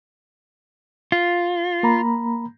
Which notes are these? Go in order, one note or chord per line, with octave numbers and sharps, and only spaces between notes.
F4
A#3 A#5 B5